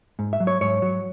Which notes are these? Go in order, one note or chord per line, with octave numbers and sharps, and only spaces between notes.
G#2
E5
F#3
C#5
G#2 C#5
F#3